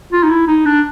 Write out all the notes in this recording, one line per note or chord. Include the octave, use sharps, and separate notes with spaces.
F4
D#4
E4
D#4
D4